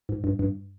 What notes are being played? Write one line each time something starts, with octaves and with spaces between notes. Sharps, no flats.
G#2
G2
G2